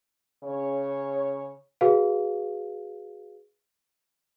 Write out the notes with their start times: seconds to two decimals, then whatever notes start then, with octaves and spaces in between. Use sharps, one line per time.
0.44 C#3 C#5
1.81 F#4 G#4 B4 F5